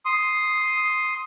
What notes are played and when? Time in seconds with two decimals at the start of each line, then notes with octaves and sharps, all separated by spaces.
0.05 C6 D#6